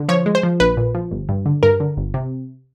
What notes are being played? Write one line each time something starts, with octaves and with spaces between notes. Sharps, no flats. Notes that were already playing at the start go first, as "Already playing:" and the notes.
Already playing: D3
F3 C#5
G#3
C5
F3
A#1 B4
A#2
F3
G1
G2
D3
G2 A#4
D3
G1
C3